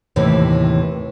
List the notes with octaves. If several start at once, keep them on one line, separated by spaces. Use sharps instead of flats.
D#2 A2 C3 E3